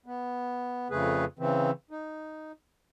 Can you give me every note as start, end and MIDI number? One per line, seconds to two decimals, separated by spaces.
0.06 0.88 59
0.91 1.25 41
0.91 1.25 49
0.91 1.25 57
0.91 1.25 68
0.91 1.25 71
1.39 1.71 49
1.39 1.71 52
1.39 1.71 60
1.91 2.52 63